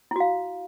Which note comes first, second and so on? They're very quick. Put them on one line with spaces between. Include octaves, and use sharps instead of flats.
E4 F#4 F5